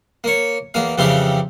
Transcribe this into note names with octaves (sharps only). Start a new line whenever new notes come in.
A#3 C#5
E2 A#3 F5
F2 C#3 E3 C4 G4 F5